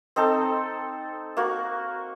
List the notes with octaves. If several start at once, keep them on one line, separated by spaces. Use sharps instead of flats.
C4 D#4 A4
A#3 F#4